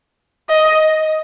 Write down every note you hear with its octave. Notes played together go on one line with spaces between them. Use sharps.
D#5